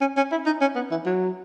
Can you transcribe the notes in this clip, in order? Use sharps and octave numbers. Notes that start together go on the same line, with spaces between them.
C#4
C#4
E4
D#4
C#4
B3
E3
F#3